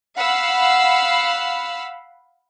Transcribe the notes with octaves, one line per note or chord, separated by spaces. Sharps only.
F5 F#5 B5 E6